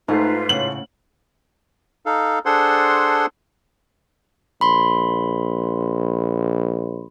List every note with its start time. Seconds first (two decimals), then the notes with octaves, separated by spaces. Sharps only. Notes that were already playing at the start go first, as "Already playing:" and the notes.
0.08 G#2 A3 D#4 F4 B4
0.49 A2 C#3 F#5 F#7
2.06 D#4 A4 F5
2.45 D4 G#4 A4 C5 F#5 C6
4.61 A#1 B5 C6